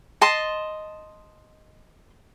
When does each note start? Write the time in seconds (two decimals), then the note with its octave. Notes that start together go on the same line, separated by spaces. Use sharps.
0.21 D#5 A5 C6